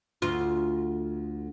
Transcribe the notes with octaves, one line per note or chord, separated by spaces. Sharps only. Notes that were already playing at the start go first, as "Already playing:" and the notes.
D2 F4